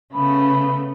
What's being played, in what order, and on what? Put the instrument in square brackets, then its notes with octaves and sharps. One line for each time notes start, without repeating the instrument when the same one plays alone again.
[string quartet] C#3 A3 B3 [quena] B5